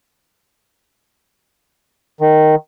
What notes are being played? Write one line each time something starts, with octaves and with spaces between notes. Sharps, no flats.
D#3